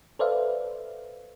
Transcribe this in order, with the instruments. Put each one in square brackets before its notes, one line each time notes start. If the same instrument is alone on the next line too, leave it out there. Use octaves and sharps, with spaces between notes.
[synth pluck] A4 B4 C5 D5 E5 F5